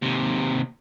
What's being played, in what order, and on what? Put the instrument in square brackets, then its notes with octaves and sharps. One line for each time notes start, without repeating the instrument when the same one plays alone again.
[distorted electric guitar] D#2 C3